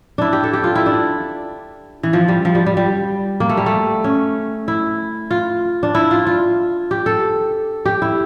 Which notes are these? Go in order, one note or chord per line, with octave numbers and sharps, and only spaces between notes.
D4 E4
G4
A4
G4
F4
E4
D4
E3
F3
G3
F3
G3
G3
G3
A#3
A3
G3
A3
C#4
E4
F4
D4
E4
F4
F4
G4
A4
G4
E4